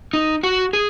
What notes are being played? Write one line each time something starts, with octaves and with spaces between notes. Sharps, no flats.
D#4
F#4
G#4